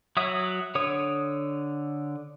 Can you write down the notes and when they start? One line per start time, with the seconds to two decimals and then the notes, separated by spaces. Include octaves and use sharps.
0.17 F#3 F#4 C#5 E5 D#6
0.75 D3 C#5 D#6